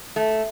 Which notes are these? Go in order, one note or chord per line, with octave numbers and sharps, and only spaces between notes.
A3